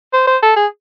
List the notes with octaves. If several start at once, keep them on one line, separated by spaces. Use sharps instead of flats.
C5
C5
A4
G#4